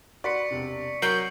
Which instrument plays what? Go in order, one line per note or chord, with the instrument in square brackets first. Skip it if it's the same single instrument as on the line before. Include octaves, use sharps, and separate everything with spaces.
[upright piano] F#4 B4 C6 [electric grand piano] D5 [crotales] C#6 B6 C#7
[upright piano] E1 C3
[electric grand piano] F#3 A#4 C7 [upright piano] F#5 A#5 C#6 [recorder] G6 [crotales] F#7